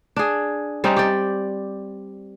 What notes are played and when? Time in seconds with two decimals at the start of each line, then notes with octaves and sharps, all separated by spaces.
0.16 D4 G#4
0.84 G3 C4 C#4 D#4
0.96 G4 D5